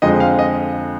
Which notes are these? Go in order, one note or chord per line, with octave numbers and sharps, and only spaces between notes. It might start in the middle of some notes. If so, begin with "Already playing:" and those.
F2 D3 F3 G#3 D#5
F5
D#5